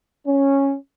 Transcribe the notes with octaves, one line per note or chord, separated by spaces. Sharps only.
C#4